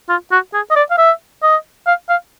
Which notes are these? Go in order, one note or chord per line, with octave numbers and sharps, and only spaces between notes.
F4
F#4
G#4
D#5
D5
F5
E5
D#5
F5
F5